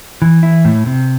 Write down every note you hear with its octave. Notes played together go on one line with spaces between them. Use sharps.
E3
E4
A2
C3